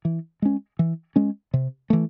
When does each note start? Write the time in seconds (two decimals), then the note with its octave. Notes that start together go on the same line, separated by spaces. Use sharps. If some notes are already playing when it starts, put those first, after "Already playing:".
0.05 E3
0.42 G#3 C#4
0.79 E3
1.16 G#3 C#4
1.54 C3
1.90 E3 A3